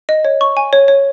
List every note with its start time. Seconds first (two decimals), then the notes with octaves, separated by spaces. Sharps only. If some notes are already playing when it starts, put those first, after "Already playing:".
0.09 D#5
0.25 C#5
0.41 C#6
0.57 G#5
0.73 C#5
0.88 C#5